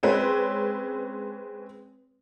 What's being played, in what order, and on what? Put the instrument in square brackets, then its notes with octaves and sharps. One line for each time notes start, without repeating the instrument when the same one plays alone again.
[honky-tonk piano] G#3 C4 C#4 B4